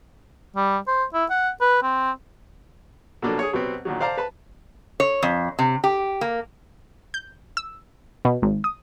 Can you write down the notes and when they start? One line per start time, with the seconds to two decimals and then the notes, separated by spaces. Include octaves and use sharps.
0.56 G3
0.87 C5
1.14 E4
1.30 F#5
1.61 B4
1.83 C4
3.22 B2 F3 F#3 A#3 D4 A4
3.39 G#4 C#5
3.53 B2 F#3 G3 B3 C4
3.85 A#2 D3 D#3 F#3
4.01 C5 D5 F5 A5 A#5
4.17 B4 A5 B5
5.00 C#5
5.23 F2
5.59 C3
5.84 G4
6.21 A#3
7.14 G6
7.57 E6
8.25 B2
8.42 G#1
8.64 D#6